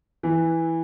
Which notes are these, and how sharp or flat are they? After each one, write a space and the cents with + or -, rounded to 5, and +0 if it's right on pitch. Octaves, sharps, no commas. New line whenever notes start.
E3 -5 B3 +0